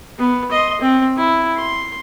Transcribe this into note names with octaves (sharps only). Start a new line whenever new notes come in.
B3
D#5 C6
C4
E4
C6